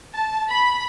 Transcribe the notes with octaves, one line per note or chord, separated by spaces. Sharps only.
A5
B5